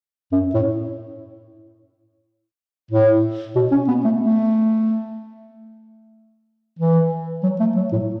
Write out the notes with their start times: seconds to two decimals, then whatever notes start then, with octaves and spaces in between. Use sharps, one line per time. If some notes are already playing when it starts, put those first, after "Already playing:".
0.32 F#2
0.54 A2
2.91 A2
3.55 B2
3.71 C#4
3.88 B3
4.04 A3
4.20 A3
6.79 E3
7.43 F#3
7.60 A3
7.76 F#3
7.92 A2